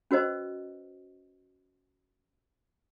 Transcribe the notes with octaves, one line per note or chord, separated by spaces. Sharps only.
C#4 F#4 B4 C5 D#5